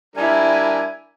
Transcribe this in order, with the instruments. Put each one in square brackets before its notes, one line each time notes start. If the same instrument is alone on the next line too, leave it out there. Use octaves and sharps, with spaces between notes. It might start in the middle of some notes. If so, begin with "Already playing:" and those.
[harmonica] G3 D4 A#4 [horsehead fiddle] E4 G#5